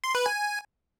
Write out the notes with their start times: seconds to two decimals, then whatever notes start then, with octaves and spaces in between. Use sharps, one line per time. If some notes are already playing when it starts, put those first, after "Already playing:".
0.04 C6
0.15 B4
0.26 G#5